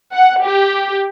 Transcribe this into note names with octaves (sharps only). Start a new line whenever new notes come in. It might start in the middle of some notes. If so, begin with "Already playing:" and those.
F#5
G4